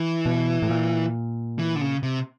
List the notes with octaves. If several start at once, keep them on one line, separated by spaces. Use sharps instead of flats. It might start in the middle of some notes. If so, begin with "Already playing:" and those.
Already playing: E3
B2
A2
A#2
E3
D3
C#3
C3